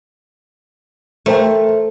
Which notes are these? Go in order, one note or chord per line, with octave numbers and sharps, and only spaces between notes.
A3 A#4 C5 G5